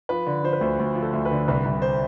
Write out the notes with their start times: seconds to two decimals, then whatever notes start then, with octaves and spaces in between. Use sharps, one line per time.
0.09 F3 B4
0.27 D3
0.44 F3 C5
0.53 B4
0.61 D2 C5
0.79 D2
0.95 F3
1.02 A4
1.13 D2
1.25 B4
1.31 D3
1.48 C2 B4
1.65 C2
1.82 C5